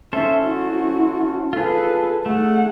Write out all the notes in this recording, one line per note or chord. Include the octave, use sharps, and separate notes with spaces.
C#4 A4 C5 E5
E4 F#4
F4 G#4 A4 B4
A3 G#4 F#5